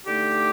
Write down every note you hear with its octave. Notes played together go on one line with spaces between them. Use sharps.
D3 A3 D#4 G4